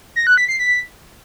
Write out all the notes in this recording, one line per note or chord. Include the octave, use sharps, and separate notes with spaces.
A#6
F#6
B6
C7
B6